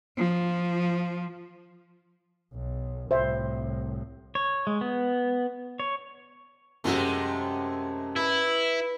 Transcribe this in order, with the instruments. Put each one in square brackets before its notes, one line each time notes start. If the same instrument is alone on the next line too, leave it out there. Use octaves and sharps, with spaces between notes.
[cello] F3
[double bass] B1
[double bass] C2 A2 [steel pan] C5 E5
[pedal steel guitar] C#5
G#3
B3
C#5
[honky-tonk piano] F#2 F#3 [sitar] C3 G#3 A3
[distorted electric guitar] E4 [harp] B4 B5